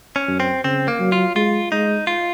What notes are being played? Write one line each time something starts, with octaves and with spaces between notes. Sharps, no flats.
C#4
F#2
C4
C#3 C4
A#3
F#3
F4
G#3 F4
G#3 D#4
F4